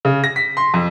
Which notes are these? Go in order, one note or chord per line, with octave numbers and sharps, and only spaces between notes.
C#3
A#6
B6
C6
F2